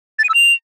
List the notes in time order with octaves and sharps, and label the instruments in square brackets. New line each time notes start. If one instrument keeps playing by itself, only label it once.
[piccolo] A6
D#7
E6
F7